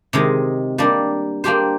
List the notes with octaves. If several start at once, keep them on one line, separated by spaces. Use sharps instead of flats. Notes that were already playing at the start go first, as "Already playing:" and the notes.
C3 D#3 G#3
G3 A#3 D4
A#3 D4 G4 C5